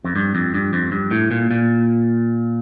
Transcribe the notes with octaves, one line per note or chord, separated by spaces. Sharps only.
F2
G2
F2
G2
F2
G2
A2
A#2
A#2